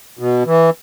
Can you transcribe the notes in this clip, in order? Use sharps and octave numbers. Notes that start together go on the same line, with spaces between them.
B2
E3